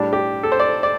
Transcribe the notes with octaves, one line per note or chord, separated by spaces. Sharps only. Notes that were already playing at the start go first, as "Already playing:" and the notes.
Already playing: A2 G3 D4
G4
A4
C5
D5
D5